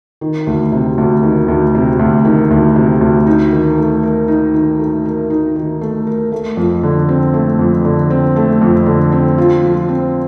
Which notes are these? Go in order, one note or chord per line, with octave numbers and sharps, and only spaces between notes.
D#3
D2
C3
D2
D#3
D2
C3
D2
D#3
D2
C3
D2
D#4
D#3
A3
A#4
D#4
D#3
A3
A#4
D#4
D#3
A3
A#4
A3
F2
D3
C4
A3
F2
D3
C4
A3
F2
D3
C4
F4
F3
C4